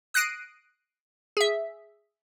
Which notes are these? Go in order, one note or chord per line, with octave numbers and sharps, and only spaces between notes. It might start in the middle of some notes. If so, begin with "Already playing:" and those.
D#6 F#6 A#6 C7 D7 D#7
G#4 E5